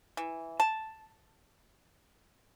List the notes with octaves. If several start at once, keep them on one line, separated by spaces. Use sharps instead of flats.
E3
A5